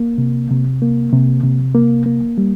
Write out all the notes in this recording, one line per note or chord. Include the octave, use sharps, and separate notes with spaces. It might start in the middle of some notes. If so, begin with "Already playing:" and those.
Already playing: A#3
C3
C3
A#3
C3
C3
A#3
A#3
G3